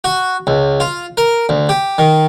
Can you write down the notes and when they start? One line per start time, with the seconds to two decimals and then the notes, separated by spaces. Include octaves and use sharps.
0.04 F#4
0.47 C#2
0.80 F4
1.17 A#4
1.49 D2
1.69 G4
1.98 D#3